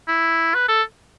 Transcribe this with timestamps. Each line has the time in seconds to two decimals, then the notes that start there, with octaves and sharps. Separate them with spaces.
0.08 E4
0.54 B4
0.68 A4